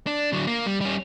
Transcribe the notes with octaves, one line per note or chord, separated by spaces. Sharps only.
D4
D3 F#3
A#3
G3
G3 C#4